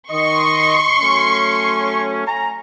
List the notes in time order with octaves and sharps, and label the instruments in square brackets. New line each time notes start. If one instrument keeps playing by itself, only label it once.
[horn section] D#3 D#5 [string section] C6 C#6
[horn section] F#3 A3 C#4
G#5 A#5